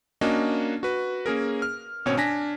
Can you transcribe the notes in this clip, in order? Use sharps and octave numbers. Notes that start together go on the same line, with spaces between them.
A#3 C#4 D4 F#4 D#5
F#4 B4
A#3 C#4 G#4 A#4
F6
G#1 B2 C4 C#4 C#5
D4 G#5 A#6 B6